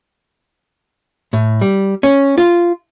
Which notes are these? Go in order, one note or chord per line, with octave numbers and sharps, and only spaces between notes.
A2
G3
C#4
F4